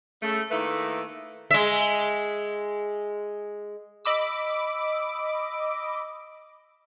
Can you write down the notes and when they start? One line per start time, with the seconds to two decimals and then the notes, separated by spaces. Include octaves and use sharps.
0.22 C#3 A3
0.51 D#3 A3 A#3 E4 B4
1.51 G#3 E5
4.05 D#5 B5 D6 E6